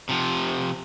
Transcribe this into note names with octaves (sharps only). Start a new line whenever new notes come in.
C3 F3